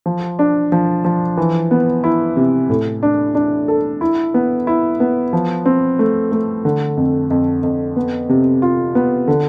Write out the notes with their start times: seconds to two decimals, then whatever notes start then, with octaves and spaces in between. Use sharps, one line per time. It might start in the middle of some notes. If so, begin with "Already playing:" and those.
0.06 F3
0.39 D4
0.72 F3
1.05 F3
1.37 E3
1.71 B3
2.04 E4
2.37 C3
2.70 A2
3.03 D4
3.35 D4
3.68 A4
4.01 E4
4.34 B3
4.67 E4
5.00 B3
5.33 F3
5.66 C4
5.99 A3
6.32 A3
6.65 D3
6.97 F2
7.30 F2
7.63 F2
7.96 B3
8.29 C3
8.62 F4
8.95 B3
9.28 D3